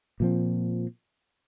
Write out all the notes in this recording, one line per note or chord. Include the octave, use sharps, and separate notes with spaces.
A#2 F3 C4